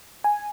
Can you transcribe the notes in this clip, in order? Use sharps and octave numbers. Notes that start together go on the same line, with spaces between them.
G#5